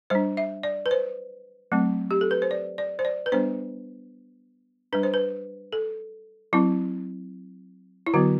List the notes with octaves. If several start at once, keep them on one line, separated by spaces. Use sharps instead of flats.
G3 D4 C5
E5
D5
B4
C5
F#3 A3 C4
G4
A4
B4
C5
D5
D5
C5
D5
B4
G3 B3 D4 C5
G3 D4 B4
C5
B4
A4
F#3 C4 E4
E4
D3 F#3 B3 F#4